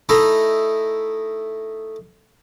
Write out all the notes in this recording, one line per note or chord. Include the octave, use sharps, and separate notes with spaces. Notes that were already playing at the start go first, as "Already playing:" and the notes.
A3 D#4 E4